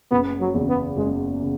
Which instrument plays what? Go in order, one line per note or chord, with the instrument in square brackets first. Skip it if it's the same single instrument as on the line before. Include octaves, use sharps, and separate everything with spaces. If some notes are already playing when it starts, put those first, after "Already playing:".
[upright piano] F#1 [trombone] B3
[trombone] F#3
[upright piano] E2 C#3
[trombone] B3
[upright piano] F#1 [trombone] G#3
[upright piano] C#3